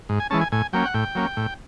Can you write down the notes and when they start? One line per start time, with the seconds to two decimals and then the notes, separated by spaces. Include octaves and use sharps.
0.09 G#2
0.20 G#5
0.30 E3 G#3 C#4 A5
0.41 G#5
0.52 A2 G#5
0.73 F#3 A#3 C#4 G5
0.85 F#5
0.94 A2 G5
1.15 F#3 A#3 C#4
1.37 A2